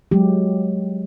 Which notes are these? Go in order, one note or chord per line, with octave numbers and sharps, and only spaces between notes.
F#3 G#3 G4